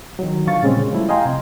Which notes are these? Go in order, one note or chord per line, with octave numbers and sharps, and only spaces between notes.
D#3 F#3
D3 F3 F5 C#6 A6
A#2 C#3 G3 G#3 C4 C#4
F3 G3 A3 E4
D#5 F5 G5 G#5 A#5 C6
C3